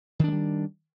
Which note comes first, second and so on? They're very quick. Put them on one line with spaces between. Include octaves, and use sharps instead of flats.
D#3 D4 G#3 G3